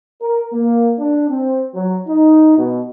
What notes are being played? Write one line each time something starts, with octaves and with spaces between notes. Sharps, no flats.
A#4
A#3
D4
C4
F#3
D#4
B2